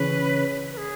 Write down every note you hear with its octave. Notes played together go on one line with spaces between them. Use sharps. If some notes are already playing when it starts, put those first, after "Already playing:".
Already playing: C#3 E3 C#4 G#4 B4 C#5
B4
G#4